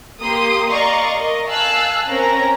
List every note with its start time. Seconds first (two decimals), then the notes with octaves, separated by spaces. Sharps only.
0.22 A#3 G4 C6 D#6
0.70 D5 D#5 F5 A#5 C6 C#6
1.17 A#4 D#5
1.48 F5 G#5 A5 E6 F#6
2.09 C4 C#4 A#4 A#5